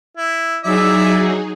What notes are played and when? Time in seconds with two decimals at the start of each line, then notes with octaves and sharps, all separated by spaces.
0.17 E4
0.64 F#3 D#4 E4 G#4 D5 E5